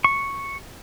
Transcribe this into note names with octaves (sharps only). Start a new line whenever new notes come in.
C#6